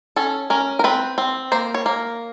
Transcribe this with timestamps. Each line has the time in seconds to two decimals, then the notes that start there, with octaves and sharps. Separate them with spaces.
0.16 C#4 A4
0.50 C#4 A#4
0.79 A#4
0.84 C4 B4
1.18 C4
1.52 A#3 C5
1.74 C#5
1.86 A#3